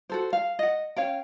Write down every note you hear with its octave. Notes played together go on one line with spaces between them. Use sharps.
F#4 A4 C5
F5
D#5 F#5
C#4 C#5 F5 G5